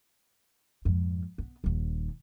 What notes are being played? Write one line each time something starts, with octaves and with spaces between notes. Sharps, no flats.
F2 G#2
B3
D#1 D#2